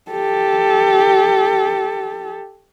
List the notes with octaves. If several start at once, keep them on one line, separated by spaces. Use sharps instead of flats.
G4 A4